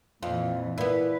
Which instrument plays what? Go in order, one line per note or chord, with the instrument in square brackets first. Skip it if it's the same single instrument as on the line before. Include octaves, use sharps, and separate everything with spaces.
[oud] F2 [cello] A#2 E3 [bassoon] F4
[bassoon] A#2 [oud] B3 E4 [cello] B4